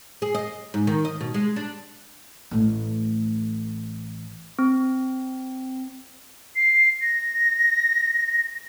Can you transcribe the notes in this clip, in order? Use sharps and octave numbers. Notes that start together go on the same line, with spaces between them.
G#4
D#5
G#2
D#3
D#5
B2
G#3
D4
A1 A3
C4
C7
A#6